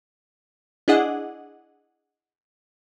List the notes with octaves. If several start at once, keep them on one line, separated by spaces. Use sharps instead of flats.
D4 E4 G#4 D#5 F#5